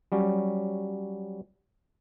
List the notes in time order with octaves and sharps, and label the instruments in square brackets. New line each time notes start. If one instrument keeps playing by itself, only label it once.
[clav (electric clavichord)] F#3 G3 C#4